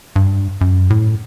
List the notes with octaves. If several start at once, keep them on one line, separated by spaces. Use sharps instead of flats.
G2
F#2
A2